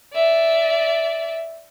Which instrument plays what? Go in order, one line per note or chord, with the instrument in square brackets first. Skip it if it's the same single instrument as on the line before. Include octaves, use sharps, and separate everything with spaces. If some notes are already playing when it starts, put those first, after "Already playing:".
[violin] D5 E5